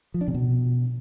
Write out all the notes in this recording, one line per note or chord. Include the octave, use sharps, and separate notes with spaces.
F3
D4
C3
B2